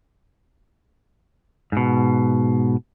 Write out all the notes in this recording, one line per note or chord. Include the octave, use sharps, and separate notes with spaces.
G#2 B2